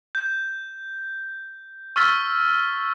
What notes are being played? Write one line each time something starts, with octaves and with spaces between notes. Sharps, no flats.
G6
C#6 E6 F6 A6 B6 G7